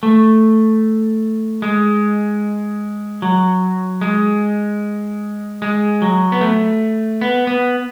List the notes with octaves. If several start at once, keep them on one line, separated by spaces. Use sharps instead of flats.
A3
G#3
F#3
G#3
G#3
F#3
B3
A3
B3
B3